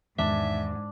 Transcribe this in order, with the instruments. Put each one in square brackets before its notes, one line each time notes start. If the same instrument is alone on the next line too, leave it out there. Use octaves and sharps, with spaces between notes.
[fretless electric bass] E2 D#3 G#3 [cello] G#2 [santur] D4 [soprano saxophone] E5